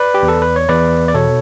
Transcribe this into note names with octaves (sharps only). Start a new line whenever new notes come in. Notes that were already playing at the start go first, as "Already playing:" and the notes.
Already playing: B4 D5
G4
E2
A4
B4
C#5
E2 B4 D5
D5
B2 A4 C#5